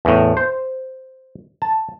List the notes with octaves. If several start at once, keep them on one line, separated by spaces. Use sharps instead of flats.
E2 A2
C5
A5